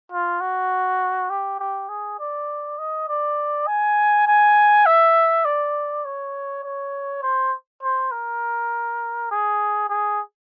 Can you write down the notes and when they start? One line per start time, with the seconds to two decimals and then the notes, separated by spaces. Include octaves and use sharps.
0.12 F4
0.41 F#4
1.30 G4
1.59 G4
1.89 G#4
2.19 D5
2.78 D#5
3.08 D5
3.67 G#5
4.27 G#5
4.86 E5
5.45 D5
6.05 C#5
6.63 C#5
7.22 C5
7.82 C5
8.11 A#4
9.31 G#4
9.89 G#4